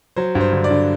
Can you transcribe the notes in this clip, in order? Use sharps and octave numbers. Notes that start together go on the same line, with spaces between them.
F#3 C5
G2
C5
D3
D5
D3